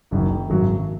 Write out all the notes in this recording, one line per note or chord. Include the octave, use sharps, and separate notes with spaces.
F#1 F#2 D#3
G#1 F#2 F#3